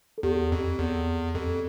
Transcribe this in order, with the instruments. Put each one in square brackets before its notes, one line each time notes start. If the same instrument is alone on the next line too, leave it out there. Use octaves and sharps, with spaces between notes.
[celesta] A4
[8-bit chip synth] E2 [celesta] G4
[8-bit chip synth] F2
E2
[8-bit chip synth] F2 [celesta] A4